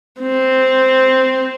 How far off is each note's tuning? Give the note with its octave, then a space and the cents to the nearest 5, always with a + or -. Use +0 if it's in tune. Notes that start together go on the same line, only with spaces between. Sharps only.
C4 -5